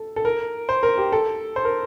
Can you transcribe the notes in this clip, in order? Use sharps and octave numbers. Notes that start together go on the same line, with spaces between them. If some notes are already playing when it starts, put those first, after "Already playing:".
Already playing: A4
A4
A#4
C5
A#4
G4
A4
C5
A#4